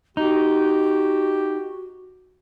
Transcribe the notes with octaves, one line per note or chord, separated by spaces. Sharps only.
D#4 F#4 G4